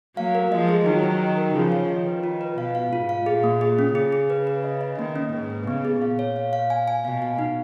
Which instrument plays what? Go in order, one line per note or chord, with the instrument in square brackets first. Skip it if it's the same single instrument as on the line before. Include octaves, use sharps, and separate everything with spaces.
[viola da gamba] F#3 A#3 [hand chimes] F5
[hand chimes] A#4
[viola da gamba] F3 G#3 [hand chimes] D#5
[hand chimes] G#4
[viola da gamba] D#3 F#3 [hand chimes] D#4
[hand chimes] D#4
C#5
A#4
[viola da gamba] C#3 F3 [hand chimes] G#4
[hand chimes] C#5
[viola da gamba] D#3 [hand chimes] D#5
[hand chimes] B4
F4
B4
[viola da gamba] B2 [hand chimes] F5
[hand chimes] F5
[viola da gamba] G#2 [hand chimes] F4
[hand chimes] F5
[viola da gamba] A#2 [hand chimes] G#4
[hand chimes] A#3
G#4
C#4
[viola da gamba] C#3 [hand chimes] G#4
[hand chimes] G#4
B4
B4
D#5
D#5
[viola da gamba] D#3 [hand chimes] A#3
[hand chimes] C#4
[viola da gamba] G#2 [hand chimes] B4
[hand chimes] B4
[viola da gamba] C#3 [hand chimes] B3
[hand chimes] G#4
[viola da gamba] A#2 [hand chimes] F5
[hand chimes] C#5
F5
F5
G#5
G#5
[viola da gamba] B2 [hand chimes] F5
[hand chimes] F5
D#4